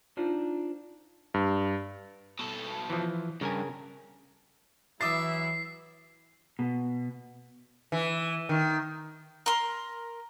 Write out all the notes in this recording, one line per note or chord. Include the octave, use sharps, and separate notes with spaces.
D4 D#4 F4 C5
G2
B2 A4
E3 F3
G2 C#3 A#4 G#5
E3 F#3 E4 E5 D6 D#6 A6 C7
B2
E3
D#3
A#4 C6